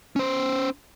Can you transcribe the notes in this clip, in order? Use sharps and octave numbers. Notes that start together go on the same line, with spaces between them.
C#4 C5